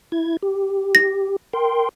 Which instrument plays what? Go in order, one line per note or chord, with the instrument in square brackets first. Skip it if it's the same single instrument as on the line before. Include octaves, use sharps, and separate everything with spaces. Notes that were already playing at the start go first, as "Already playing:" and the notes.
[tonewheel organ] E4 G#6
G4
[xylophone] A#6
[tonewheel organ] A#4 G5 C6